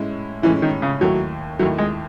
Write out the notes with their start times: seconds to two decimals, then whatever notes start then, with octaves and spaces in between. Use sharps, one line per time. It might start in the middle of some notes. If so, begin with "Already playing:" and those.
Already playing: A2 G#3 C#4 E4
0.42 A2 E3 G#3 C#4 E4
0.62 D#3
0.82 C#3
1.01 D#2 D#3 F#3 A3 E4
1.59 D#2 D#3 F#3 A3 E4
1.78 G#3